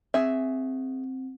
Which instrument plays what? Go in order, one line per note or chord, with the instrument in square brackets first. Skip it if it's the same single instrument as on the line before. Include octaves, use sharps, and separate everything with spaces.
[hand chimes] C4 [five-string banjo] G#4 E5